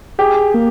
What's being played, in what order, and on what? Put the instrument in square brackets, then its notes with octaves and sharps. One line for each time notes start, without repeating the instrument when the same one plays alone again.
[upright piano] G4 [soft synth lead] G#4
[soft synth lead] A#3